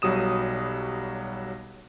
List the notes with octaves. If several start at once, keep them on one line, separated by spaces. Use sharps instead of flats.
B1 F#3 G3 D#6 E7